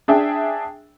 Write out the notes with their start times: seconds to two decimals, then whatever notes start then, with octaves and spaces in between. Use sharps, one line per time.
0.08 D4 G#4 E5 G5